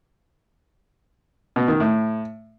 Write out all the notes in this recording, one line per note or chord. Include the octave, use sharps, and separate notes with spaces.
B2
D#3
A2